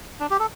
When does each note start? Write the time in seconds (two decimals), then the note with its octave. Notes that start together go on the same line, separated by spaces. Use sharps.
0.20 D4
0.30 G4
0.40 A4